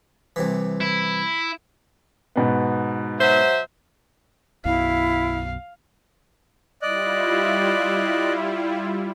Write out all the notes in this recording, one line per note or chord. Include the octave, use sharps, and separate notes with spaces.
C2 C3 E3
E4
G#2 B2 B3
F#3 C5 E5
B1 F#2 B2 E4 F5
G3 E4 F4 D5 D#5 F#6